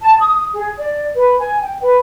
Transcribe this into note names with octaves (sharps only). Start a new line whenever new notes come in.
A5
D#6
G#4
D5
B4
G#5
G5
B4